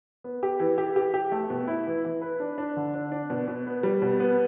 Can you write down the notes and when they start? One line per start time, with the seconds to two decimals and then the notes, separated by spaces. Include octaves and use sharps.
0.24 B3
0.43 G4
0.60 E3
0.78 G4
0.96 G4
1.14 G4
1.32 A3
1.50 B2
1.67 E4
1.87 E3
2.05 E3
2.22 B4
2.40 D4
2.58 D4
2.77 D3
2.94 D4
3.12 D4
3.30 B2
3.48 B2
3.67 B3
3.83 G3
4.02 B2
4.20 B3